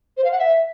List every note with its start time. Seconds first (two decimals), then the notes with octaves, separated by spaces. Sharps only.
0.17 C5
0.24 F5
0.32 F#5
0.39 E5